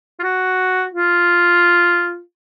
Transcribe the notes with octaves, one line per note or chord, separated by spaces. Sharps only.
F4
F#4
F4